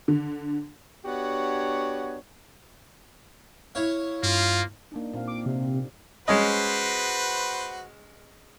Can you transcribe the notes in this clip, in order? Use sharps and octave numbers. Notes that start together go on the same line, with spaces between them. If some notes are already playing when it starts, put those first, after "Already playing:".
D3
B3 D4 F#4 G4 C#5
E4 C#5 F5
G2 A#3 F4
A#3 D4 D#4
A#2 C4 F5
D6
C3
G4
G#3 C#4 F#4 B4 C5 D#5